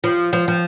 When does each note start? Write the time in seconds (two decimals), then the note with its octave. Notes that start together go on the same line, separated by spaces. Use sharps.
0.04 F3
0.33 F3
0.48 F3